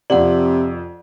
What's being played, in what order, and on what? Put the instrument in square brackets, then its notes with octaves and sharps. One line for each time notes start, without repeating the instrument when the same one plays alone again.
[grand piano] F2 F#7 [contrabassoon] C3 [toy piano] D5 F5 F#5